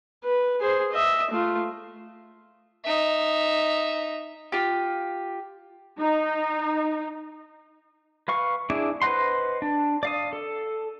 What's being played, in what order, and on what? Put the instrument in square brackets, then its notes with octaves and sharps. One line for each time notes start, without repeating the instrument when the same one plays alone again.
[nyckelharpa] B4
G#4 C5
D#5 E5
A3 F4
[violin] D#4 E5
[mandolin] F4 G4
[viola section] D#4
[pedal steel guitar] B4 F5 C#6
D4 E4 G#4 D6
B4 C5 D#5 F#5 C6
D4
D5 F5 D#6
A4